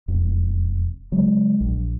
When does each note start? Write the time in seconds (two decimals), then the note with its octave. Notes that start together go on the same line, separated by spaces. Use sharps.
0.08 E1 F2
1.12 C#3 F#3 G#3
1.60 A#1